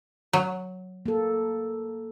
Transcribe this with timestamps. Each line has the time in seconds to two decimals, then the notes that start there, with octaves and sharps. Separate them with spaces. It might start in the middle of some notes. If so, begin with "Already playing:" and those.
0.33 F#3
1.06 A#3 A4